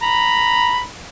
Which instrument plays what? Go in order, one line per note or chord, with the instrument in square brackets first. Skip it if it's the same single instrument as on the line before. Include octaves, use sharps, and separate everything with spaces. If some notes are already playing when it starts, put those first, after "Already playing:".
[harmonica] A#5 B5